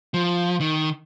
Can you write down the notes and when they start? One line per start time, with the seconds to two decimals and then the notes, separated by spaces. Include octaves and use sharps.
0.14 F3
0.60 D#3